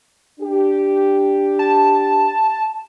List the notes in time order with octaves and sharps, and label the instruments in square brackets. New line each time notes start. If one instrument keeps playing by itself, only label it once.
[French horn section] D4 G4
[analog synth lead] A5